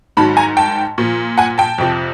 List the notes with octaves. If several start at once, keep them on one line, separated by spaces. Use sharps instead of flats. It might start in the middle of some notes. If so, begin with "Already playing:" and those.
G#2 D#3 F#3 A5 B5
G#5 A#5
G5 A5
A#2 F3
F#5 G#5
G5 A5
F2 C3 F3